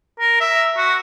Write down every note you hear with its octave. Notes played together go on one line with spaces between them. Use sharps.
A#4
E5
F#4